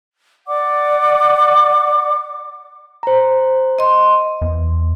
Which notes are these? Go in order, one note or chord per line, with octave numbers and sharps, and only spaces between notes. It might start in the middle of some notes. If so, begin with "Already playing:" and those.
D5 F#5 D6
C5 A#5
D#5 C6
E2